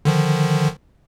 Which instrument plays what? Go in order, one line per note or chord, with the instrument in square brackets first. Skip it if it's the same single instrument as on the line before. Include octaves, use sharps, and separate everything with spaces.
[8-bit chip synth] D3 D#3 F3